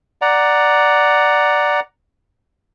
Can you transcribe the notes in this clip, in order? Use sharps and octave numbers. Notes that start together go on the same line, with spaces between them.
D5 F#5 A#5